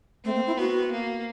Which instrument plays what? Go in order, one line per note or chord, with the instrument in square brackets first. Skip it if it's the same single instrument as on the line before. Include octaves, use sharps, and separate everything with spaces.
[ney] A3 [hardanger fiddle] C4
[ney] A#3
E4
[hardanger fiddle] B3 [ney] F#4
[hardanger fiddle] A#3